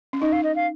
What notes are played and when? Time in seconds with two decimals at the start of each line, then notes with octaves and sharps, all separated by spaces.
0.13 C#4
0.21 D#4 D#5
0.33 F5
0.43 D#5
0.56 F5